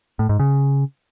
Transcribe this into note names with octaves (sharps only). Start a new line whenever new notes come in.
A2
G#2
C#3